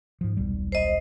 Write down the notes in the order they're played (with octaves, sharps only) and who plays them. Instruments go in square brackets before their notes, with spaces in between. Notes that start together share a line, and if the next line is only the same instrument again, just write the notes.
[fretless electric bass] G#2 F3
D#1 B1 G3
[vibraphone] C5 D#5